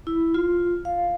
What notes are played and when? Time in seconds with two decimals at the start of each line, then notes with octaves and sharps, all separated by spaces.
0.07 E4
0.34 F4
0.85 F5